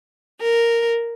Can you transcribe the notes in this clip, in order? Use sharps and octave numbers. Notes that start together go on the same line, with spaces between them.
A#4